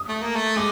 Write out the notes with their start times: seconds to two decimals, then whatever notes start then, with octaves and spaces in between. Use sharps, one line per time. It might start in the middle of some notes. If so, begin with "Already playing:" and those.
Already playing: D#6
0.09 A3
0.22 A#3
0.35 A3
0.56 G#3 D6